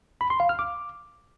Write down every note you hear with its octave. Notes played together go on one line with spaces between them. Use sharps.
B5
C6
F5
F6
D6